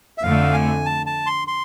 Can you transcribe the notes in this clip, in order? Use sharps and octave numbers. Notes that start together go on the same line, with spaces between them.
E5
F2 D3 A3 F5
G#5
A5
A5
C6
C6